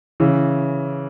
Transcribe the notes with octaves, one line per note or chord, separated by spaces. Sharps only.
C#3 E3